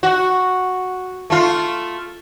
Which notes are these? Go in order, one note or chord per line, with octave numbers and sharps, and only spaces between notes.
F#4
A3 F4